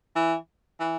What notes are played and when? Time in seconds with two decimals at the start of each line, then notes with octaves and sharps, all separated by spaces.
0.15 E3
0.80 E3